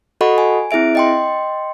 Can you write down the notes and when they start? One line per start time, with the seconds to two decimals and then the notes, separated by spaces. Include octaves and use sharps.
0.21 F#4 A4 D#5 F#5 B5 C#6
0.38 G#5
0.71 C4 E4 G#4 E5 D7
0.95 D#5 G5 C6